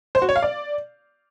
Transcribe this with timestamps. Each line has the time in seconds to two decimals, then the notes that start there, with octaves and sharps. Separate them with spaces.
0.15 C5
0.22 F#4
0.29 C#5
0.36 F5
0.42 D5